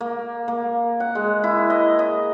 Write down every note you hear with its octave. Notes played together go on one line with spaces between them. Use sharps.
A#3
A#3
F#5
G#3
E4
D#5
D#5